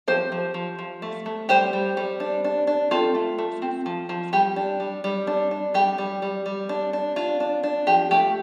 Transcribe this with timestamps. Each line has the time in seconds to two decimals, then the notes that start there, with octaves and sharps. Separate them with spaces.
0.08 F3 G4 C5
0.32 F3
0.54 F3
0.79 F3
1.02 A3
1.26 A3
1.49 G3 G4 C5
1.73 G3
1.97 G3
2.20 D4
2.44 D4
2.67 D4
2.91 C4 F4 A4
3.15 A3
3.38 A3
3.62 C4
3.86 F3
4.09 F3
4.33 G3 G4
4.56 D4
4.80 G3
5.04 G3
5.27 D4
5.51 D4
5.74 G3 G4
5.98 G3
6.22 G3
6.46 G3
6.69 D4
6.93 D4
7.16 D4 F4
7.40 D4
7.63 D4
7.87 F3 G4
8.11 A3 G4